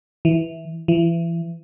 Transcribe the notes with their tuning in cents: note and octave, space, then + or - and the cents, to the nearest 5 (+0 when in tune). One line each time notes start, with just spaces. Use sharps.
E3 -10
E3 +30